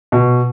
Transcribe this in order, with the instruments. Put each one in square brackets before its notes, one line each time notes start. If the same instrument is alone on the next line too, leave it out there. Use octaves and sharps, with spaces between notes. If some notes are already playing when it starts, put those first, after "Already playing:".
[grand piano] B2